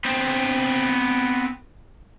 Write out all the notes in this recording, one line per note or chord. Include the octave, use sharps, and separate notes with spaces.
B3 C4